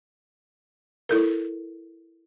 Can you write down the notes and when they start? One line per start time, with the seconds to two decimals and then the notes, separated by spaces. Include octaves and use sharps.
1.09 E4 A4 A#4